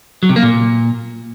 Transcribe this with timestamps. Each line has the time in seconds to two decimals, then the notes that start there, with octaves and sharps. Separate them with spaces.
0.23 F#3
0.29 C3
0.36 A#3
0.43 A#2